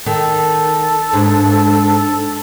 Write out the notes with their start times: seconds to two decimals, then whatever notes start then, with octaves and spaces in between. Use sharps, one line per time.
0.06 D#3 A4
1.13 G#2 D4